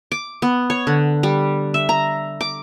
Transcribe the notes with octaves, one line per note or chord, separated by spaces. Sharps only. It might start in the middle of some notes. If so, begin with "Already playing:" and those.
D6
B3
C#5
D3
G3
E5
A#5
D6